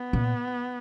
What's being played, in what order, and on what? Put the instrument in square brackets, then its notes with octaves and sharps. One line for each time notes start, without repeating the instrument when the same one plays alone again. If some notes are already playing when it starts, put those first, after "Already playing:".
Already playing: [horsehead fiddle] B3
[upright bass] A#2